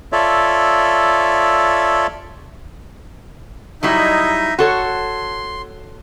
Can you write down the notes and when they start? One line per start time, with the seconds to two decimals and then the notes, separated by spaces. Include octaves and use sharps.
0.12 F4 A4 C#5 D5 E5
3.83 F#3 G3 D#4 E4 D#5 E5
4.59 F#4 A4 C#5 C6